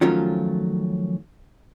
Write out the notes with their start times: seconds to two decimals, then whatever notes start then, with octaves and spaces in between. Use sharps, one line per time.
0.01 D#3 F3 F#3 A3 C#4 F4